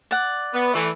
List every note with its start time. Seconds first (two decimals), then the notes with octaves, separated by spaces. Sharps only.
0.11 D5 F#5
0.54 B3
0.73 E3 A3